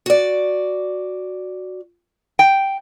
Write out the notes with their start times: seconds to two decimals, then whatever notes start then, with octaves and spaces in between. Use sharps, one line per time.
0.06 F#4 D5
2.39 G5